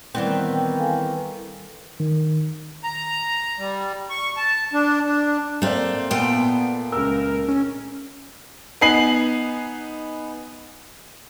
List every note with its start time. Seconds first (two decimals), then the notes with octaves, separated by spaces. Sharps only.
0.15 D#3 E3 G3 B3 C4 E4 D5
0.78 A4 F5 G#5
2.00 D#3
2.84 A#5
3.58 G3
4.10 C#6
4.37 A5
4.73 D4
5.05 D4
5.62 A3 A#3 C4 D5
6.11 A#2 A3 B3 G5
6.92 C#2 A#4 E6
7.48 C#4
8.81 B3 D#4 G#5 C7 F#7